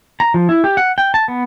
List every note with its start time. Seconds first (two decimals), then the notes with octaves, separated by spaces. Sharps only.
0.20 A#5
0.34 F3
0.49 E4
0.64 G4
0.77 F#5
0.98 G5
1.14 A5
1.28 B3